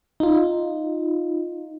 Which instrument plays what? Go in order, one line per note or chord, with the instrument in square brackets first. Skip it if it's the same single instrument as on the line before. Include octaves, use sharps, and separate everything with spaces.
[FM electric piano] D#4 F4